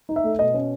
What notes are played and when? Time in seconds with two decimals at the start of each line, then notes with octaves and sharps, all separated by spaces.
0.09 D#4
0.16 E5
0.24 A3
0.39 B2 D#5
0.54 C#4